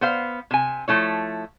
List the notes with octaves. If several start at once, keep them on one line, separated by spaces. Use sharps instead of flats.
B3 C5 F5
C3 G#5
F3 A3 E4 C#5